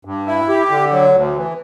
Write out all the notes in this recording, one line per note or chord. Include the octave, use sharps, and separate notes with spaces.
G2
E4
G4
D3
F#3
D2
E3